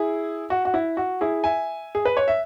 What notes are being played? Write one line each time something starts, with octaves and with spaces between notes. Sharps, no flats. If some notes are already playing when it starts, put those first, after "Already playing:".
Already playing: E4 G#4
F#4
F#4
E4
F#4
E4 G#4
E5 G#5
G#4
B4
C#5
E5